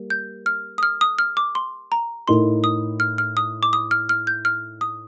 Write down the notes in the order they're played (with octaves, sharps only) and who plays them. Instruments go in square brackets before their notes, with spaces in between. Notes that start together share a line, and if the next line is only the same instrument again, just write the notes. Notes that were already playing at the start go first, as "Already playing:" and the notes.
Already playing: [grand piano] G3 A#3
[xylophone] G6
F6
D#6
F6
D#6
F6
D6
C6
A#5
[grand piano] A2 A3 D#4 A#4 [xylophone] C6
[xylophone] D#6
F6
F6
D#6
D6
D#6
F6
F6
G6
F6
D#6